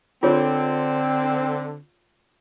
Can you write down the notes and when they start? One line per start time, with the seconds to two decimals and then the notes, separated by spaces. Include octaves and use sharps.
0.23 D3 C4 F4 G#4 C#5